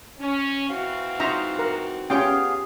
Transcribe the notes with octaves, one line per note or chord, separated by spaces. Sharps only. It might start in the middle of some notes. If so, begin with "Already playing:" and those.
C#4
E3 C4 F#4 F5
G#3 D#4 F4 E5 A#5
A#4
B3 C#4 F4 G4 G#4 C#5 F5 G5